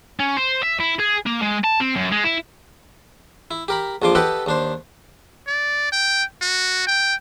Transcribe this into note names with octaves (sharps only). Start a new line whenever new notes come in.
C#4
C5
E5
E4
G#4
A#3
G#3
A5
C4
F#2
G#3
E4
E4
G4 A#4 B5
A#1 F2 F3 C6 D6
G4 A4 B4 D#5 F#5 G5
D#2 D4 C5
D5
G5
F#4
G5